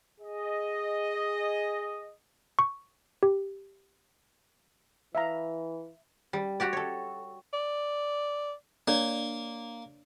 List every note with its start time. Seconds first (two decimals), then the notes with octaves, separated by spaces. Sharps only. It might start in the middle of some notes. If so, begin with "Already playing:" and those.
0.21 G#4 D#5
2.59 C#6
3.23 G4
5.15 E3 E5 F5 A#5
6.33 G3
6.60 F#4 G4 D5
6.73 A4 C#5
7.53 D5
8.88 A#3 D4 C#5 D5